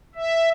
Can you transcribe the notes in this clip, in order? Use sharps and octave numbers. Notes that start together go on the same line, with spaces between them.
E5